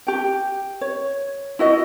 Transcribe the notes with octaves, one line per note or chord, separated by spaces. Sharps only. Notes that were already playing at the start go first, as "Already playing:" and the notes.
G4 G5
C#5
E4 F#4 D#5